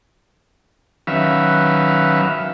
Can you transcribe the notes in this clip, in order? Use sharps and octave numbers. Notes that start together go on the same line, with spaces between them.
D#3 F#3 C#4 B4 E5 F5